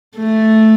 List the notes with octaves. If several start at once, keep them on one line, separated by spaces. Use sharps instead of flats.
A3